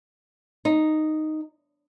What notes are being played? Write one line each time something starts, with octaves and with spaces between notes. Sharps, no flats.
D#4